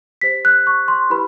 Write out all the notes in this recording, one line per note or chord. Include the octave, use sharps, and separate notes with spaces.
G4 C5 B6
F#6
C#6
C6
E4 G4 B4 B5